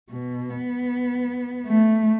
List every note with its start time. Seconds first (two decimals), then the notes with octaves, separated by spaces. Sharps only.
0.10 B2
0.50 B3
1.66 A3